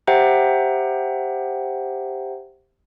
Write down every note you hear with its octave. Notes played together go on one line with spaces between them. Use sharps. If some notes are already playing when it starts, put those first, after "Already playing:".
G4 C5 E5 F#5 G5 A#5